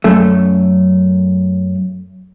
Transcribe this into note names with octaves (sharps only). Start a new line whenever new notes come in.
F#2 A3